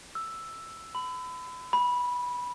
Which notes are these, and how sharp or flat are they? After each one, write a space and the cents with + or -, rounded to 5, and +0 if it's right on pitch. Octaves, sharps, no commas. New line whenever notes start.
E6 +5
B5 +30
B5 -15